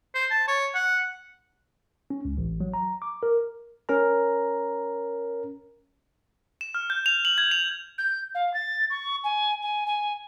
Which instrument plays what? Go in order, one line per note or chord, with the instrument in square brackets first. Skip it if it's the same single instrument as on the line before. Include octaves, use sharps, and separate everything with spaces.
[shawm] C5
A5
C#5
F#5
[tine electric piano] C#4
C#2
A1
F#3
A#5
D6
A#4
C#4 A#4 A#5
[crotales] E7
F6
G6
F7
F#7
G#6
F7
[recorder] G6
F5
A6
C#6
G#5
G#5
G#5